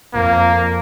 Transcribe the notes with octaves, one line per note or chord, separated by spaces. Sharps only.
F2 A#3